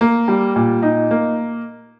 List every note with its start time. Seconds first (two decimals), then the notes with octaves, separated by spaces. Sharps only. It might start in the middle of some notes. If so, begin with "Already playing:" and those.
0.01 A#3
0.28 G3
0.56 A#2
0.82 D#4
1.11 A#3